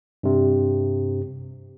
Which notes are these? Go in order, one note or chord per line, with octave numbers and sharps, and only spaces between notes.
G2 C3